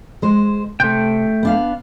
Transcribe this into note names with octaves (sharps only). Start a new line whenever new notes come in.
G#3 C5
C3 A3 G5
B3 D4 F5